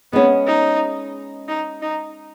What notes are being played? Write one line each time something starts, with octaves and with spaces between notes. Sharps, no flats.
G#3 B3 C#4 G#4
D#4
D#4
D#4